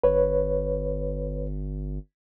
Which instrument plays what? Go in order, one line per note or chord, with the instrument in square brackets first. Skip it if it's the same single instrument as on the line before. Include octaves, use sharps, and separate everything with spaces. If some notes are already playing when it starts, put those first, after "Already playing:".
[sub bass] G1 [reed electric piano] B4 C#5